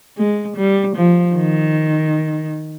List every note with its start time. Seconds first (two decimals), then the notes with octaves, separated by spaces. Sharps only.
0.18 G#3
0.57 G3
0.96 F3
1.36 D#3